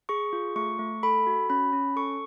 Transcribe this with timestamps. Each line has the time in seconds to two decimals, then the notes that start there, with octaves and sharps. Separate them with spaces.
0.09 G#4 C#6
0.33 F4
0.56 A3 C#6
0.79 A3
1.03 A4 B5
1.27 F#4
1.50 C#4 B5
1.73 C#4
1.96 A4 C#6